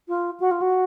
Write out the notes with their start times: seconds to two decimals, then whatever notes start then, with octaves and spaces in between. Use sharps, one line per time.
0.08 F4
0.39 F#4
0.51 F4
0.61 F#4